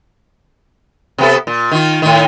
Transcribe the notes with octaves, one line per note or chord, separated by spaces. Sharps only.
C3 B3 A4
A#2
D#3 F4
A2 D#3